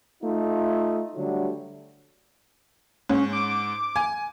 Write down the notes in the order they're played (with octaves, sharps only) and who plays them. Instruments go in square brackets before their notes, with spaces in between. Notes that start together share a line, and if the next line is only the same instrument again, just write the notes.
[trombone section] A3 D#4 F4
D3 F#3 G3 A3
[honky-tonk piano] G#2 [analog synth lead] C#4
[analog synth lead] D6
[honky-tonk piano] G#5